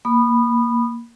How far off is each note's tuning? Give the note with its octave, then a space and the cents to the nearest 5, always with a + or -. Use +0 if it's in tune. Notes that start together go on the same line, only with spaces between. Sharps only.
A#3 +0 B5 +0 D#6 -30